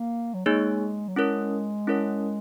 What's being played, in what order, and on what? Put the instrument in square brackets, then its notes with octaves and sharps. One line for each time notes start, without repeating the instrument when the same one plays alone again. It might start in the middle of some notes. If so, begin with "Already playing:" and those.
Already playing: [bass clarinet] A#3
F#3
[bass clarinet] G#3 [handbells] A#3 D#4 G#4 C#5
[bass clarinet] F#3
[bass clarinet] G#3 [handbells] C#4 E4 A#4 C#5
[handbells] C#4 E4 A#4 C#5